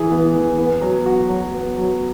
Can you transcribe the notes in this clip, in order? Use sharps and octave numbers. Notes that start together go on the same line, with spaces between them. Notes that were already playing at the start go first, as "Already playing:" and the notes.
Already playing: E3 E4 G#4
B3
E3
B3
F#3
F#4
F#3
B3
F#3